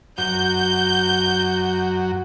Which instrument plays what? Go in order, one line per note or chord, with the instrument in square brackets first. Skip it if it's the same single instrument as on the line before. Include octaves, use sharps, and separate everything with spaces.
[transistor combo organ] F#2 F#4 [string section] G6